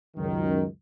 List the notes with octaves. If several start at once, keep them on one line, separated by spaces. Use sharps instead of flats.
C#2 F#2 D#3